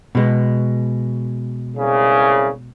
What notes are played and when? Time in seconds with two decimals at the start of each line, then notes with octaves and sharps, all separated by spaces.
0.15 B2 G#3
1.77 C2 C#3